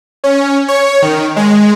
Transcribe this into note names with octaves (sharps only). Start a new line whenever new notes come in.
C#4
C#5
D#3
G#3